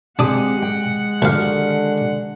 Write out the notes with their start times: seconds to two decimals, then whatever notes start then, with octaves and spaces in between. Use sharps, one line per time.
0.19 G#3 C4 D4 G4 G#4 F#5 D#6
0.62 G5
1.22 D2 D3 D#3 G4 F5